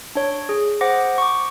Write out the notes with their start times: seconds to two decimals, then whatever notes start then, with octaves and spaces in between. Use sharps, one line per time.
0.15 D4 C#5
0.49 G#4
0.81 C5 F#5 D6 A#6
1.18 C#6 D6